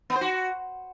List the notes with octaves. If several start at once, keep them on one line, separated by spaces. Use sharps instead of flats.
B3
C5
F#4